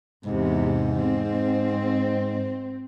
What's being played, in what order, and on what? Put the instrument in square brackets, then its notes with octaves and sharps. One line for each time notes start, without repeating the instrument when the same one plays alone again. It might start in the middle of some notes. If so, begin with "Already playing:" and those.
[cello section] E2 C3 [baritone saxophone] G#2
[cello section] C4